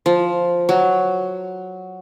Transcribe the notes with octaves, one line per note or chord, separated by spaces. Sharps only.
F3
F#3